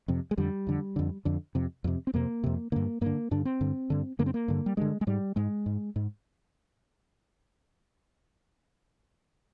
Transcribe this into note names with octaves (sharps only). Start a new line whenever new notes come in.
F2 C3
G#3
F2 D3 G3
F2 D3
F2 D3
F2 D3
F2 C3
F2 C3
C4
F2 C3 A#3
F2 C3
G2 D3 A#3
G2 D3 A#3
G2 D3 D4
C4
G2 D3
G2 D3
G2 D3 A#3
C4
A#3
G2 D3
G3
G2 D3 G#3
G#3
G#2 G3
G#2 G#3
G#2
G#2